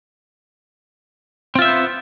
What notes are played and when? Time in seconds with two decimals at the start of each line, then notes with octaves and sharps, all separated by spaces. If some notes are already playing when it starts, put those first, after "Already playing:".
1.55 C4
1.59 F4
1.62 E5
1.65 C5
1.68 B3